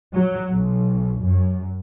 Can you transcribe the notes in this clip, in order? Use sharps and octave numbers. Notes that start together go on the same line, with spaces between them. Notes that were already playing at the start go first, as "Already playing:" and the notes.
F#3
B1
F#2